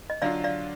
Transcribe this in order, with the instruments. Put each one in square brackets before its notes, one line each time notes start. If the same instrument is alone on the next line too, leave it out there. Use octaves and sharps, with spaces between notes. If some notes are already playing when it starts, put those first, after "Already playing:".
[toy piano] D#5
[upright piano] D3 F#3 D4 F4 [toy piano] D5 F5
[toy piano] D5 F5